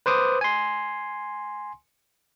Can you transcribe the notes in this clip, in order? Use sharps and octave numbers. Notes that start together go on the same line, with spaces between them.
B4 C5 D6 D#6
G#5 C6